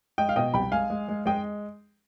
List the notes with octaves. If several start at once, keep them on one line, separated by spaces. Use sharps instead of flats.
G#3 D#5 G5
F5
B2 D#5 G5
C2 G5 B5
G#3 F5 G#5
G#3
G#3
G#3 D#5 G5